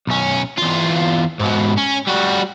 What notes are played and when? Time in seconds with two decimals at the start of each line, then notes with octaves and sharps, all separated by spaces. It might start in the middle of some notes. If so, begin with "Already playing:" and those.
0.07 B1 C#4
0.58 E2 F4
1.40 G#2 B2
1.78 C#4
2.07 G3 F#4